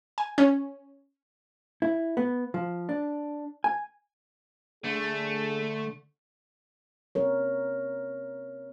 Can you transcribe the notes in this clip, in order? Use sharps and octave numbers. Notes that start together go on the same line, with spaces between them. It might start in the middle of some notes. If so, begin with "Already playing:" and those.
G#5
C#4
E4
B3
F3
D4
G#5
D3 A3 G#4
C4 A#4 C#5